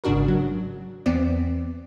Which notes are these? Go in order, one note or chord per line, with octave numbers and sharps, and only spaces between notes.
G#1 G#2 C#3 D4 F#4 A#4
F#3
E2 B3 C4 D5